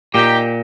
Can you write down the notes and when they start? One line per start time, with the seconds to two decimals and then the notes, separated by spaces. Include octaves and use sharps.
0.14 A#2 D#4 G4